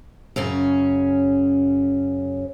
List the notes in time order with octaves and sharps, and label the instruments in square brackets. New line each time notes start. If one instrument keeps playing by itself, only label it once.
[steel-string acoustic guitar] F#2 C#3 C#4